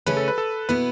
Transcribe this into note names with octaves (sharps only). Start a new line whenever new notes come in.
C#3 A3 C#4 B4
A4
B4
A4
B2 B3 E4 B4